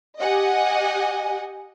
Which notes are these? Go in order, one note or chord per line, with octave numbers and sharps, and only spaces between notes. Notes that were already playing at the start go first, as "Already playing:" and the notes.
G4 D#5 F#5 G#5